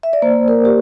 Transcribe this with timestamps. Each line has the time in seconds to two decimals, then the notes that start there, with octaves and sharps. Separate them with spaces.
0.03 E5
0.13 D5
0.22 A#3 C5
0.48 A#3 A#4
0.65 G4